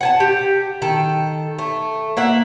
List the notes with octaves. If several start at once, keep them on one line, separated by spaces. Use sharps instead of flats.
F#5 G#5 A5
G4
D#3 A4
A3
A#3 E5 F#5